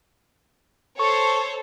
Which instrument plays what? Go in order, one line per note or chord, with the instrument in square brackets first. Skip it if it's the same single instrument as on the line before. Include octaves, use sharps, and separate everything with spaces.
[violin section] A4 C5 C#5 [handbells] C#6